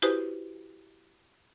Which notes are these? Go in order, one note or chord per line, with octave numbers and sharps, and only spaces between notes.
E4 F#4 G4 B4 C5 D#6